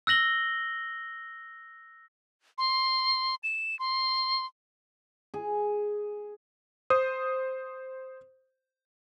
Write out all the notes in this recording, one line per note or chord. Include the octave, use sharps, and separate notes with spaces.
E6 F#6 A#6 F#7 G7
C6
E7
C6
G#4
C5 D#6